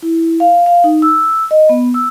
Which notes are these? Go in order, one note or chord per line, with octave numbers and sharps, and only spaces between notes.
E4
F5
F5
D#4
E6
D#5
B3
E6